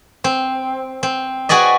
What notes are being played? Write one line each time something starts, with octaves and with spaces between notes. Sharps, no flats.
C4
C4
F#4 G#4 B4 D5 D#5